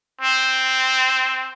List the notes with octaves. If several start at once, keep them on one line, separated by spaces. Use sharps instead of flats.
C4